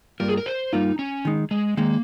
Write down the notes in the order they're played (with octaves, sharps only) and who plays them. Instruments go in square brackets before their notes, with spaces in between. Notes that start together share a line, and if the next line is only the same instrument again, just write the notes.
[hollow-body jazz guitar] G2 G3 A#3 F4 [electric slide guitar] A#4
[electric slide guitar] G#4
A#4
C5
[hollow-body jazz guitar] G2 G3 A#3 F4 [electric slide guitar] D#4
[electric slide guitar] C#4
[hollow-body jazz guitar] D#3 G#3 D#4
[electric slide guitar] G#3
[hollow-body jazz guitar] D#3 G#3 D#4 [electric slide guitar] A#3